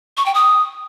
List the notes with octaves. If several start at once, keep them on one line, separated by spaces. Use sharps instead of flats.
C#6
G5
D#6